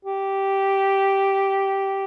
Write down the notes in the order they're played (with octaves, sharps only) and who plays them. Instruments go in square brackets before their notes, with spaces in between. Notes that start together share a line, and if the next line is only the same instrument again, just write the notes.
[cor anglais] G4